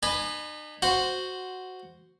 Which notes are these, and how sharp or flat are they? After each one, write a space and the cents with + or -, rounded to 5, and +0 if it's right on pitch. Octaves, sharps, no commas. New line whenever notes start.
D#4 -45 B4 +0 G#5 +0
F#4 +0 C5 -5 F#5 +0